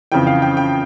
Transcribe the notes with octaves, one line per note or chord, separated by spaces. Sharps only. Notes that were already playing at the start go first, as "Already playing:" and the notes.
F2 C#3 E3 G5
F5
G5
G5